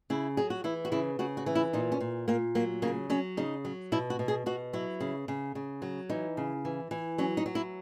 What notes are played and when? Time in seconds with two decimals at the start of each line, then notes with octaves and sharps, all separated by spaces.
0.10 C#3 E4
0.37 F#3 G#4
0.50 F#4
0.64 E3 E4
0.85 F#4
0.92 C#3 E4
1.19 C#3 F#4
1.37 F#4
1.46 E3
1.55 E4
1.73 A#2 D#4
1.92 C#4
2.00 A#2
2.28 A#2 A#3
2.55 F#3 A#3
2.82 C#3 A#3
3.10 F#3 C#4
3.37 C#3 D#4
3.65 F#3
3.92 B2 E4
4.10 F#4
4.19 B2
4.28 G#4
4.46 B2 F#4
4.73 F#3 E4
5.00 C#3
5.28 C#3
5.55 C#3
5.82 F#3
6.10 E3 D#4
6.37 C#3
6.65 E3
6.91 E3
7.18 F#3 C#4
7.37 D#4
7.46 F#3
7.55 E4